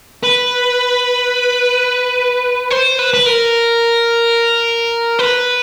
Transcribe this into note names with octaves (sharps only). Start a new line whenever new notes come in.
B4
C5
B4
B4
A#4
B4